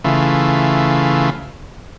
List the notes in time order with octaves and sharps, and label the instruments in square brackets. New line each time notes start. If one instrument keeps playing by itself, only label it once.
[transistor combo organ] C#3 E3 A3 F4